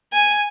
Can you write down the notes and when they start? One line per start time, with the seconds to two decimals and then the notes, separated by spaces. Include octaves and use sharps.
0.13 G#5